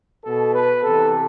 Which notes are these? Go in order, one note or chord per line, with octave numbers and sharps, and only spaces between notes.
B2 A4
B4
C3 E3 A4